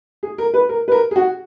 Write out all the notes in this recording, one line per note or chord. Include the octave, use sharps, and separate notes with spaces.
G#4
A#4
B4
A#4
B4
A#4
G#4
F#4